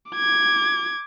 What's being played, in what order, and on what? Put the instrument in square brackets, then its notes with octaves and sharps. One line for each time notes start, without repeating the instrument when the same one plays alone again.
[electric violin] D6 G#6